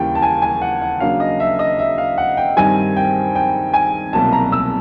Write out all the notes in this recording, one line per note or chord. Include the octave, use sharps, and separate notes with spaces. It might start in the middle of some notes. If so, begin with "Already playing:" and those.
Already playing: D#2 C#3 E3 G3 A#3 G5
A5
G#5
G#5
F#5
F#5
C#3 F#3 A#3 D4 F5
D#5
E5
D#5
E5
F5
F#5
G5
G2 D#3 G3 C4 D#4 G#5
G5
G5
G#5
C2 B2 F#3 A#3 A5
A#5
E6